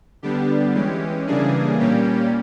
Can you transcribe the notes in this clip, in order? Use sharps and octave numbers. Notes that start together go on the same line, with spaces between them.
D3 G3 B3 D4 G4
E3 G#3 C#4 G4
C#3 E3 G3 A#3 D4 G#4
A#2 G3 A#3 C#4 G4